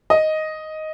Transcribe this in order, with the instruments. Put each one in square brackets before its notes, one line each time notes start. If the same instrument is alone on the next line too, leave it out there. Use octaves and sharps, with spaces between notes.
[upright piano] D#5